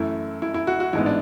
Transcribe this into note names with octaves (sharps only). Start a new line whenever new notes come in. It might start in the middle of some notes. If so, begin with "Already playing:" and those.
Already playing: F#2 E3 A3 E4
E4
E4
F#4
F#4
A1 G#2 G#3 B3 E4
D4